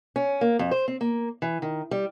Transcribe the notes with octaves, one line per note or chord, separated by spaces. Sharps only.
C#4
A#3
F2
C5
C4
A#3
E3
D#3
G3